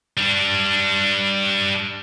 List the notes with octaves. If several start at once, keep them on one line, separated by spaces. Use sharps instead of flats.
G3 D4